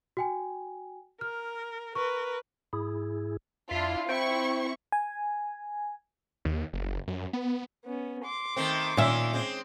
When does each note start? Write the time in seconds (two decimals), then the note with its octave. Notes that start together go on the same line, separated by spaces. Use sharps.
0.17 F#4 G5 G#5
1.21 A#4 F6
1.95 A#4 B4 C#6
2.73 G#2 E4 G#4
3.71 F2 D4 E4 F4 E5 F5
4.09 C4 E4 C5 G5 C#6
4.92 G#5
6.45 D#2
6.73 F#1
7.08 F#2
7.33 B3
7.85 B3 C#4
8.25 C6 D6
8.56 D#3 A3 C4
8.97 A#2 D#3 C#4 E5
9.33 G#3 C4